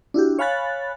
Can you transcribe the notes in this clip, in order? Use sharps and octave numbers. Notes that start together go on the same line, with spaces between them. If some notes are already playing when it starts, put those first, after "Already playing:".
D4 E4 F#4 G4
C#5 F5 G#5 B5 F#6 A6